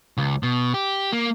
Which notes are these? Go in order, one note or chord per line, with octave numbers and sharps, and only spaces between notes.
C#2
B2
G4
A#3